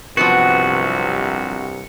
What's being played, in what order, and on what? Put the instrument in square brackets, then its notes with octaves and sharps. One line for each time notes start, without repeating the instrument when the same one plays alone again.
[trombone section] C2 G2 C3 [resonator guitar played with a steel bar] F3 F#3 B3 [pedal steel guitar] F#4 [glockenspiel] C#7